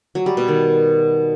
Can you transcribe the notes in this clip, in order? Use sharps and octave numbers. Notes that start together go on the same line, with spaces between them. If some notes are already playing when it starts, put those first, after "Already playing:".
F#3
G3
B2
D#3